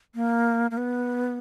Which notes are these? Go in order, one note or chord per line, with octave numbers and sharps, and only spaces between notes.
A#3
A#3
B3